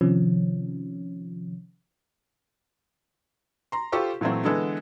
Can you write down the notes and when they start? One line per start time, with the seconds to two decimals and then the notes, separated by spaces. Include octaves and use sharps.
0.01 C3 D#3 F3 C#4
3.72 A#5 C6
3.92 F4 G4 A4 C5 C#6
4.21 A#2 E3 F#3 A3 C4
4.45 D3 E3 G#3 B3 A4